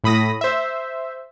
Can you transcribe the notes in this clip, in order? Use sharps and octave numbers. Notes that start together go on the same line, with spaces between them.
A2 B5 D#6 A#6
C5 E5